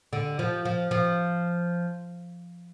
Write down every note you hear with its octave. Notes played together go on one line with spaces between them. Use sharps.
D3
F3
F3
F3